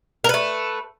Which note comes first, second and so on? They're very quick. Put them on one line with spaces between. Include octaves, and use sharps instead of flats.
A#4 B4 A3